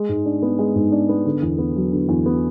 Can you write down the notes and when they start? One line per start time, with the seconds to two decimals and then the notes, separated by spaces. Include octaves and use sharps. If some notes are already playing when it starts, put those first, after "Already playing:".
Already playing: G#3
0.09 G#2
0.25 D4
0.42 B3
0.59 G#3
0.76 G#2
0.92 D4
1.09 B3
1.25 D3
1.42 E2
1.58 B3
1.76 F#3
1.92 D3
2.09 E2
2.26 B3